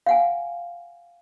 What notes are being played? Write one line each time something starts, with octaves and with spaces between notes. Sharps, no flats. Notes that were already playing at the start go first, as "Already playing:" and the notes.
F5 F#5 G#5